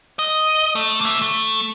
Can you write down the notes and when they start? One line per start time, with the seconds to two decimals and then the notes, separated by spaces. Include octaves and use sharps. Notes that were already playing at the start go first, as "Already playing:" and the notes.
0.19 D#5
0.75 A3
1.01 A#3 E5
1.22 A3